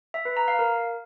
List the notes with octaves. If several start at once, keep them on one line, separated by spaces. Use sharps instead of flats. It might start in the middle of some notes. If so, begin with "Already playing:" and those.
E5
B4
A#5
F5
A#4